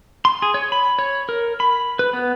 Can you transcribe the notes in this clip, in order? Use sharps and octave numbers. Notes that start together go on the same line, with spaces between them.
C6
G#4
C#5
B5
C#5
A#4
B5
B4
B3